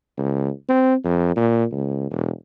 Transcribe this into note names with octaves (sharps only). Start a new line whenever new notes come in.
C#2
C4
F2
A#2
C#2
E1